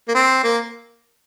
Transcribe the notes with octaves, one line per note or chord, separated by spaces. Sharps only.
A#3
C4
A#3